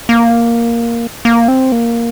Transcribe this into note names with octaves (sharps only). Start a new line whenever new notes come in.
A#3
A#3
C4
A#3